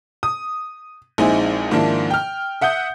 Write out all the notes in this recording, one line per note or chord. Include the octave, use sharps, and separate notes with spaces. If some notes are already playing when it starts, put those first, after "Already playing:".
D#6
A#1 G#3 C4 D#4 E4 G#5
G#2 D#3 F3 A#3 D4 E4
G5 F6
E5 F#5 D#6 G6